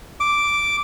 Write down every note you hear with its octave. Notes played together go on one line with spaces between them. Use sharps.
D6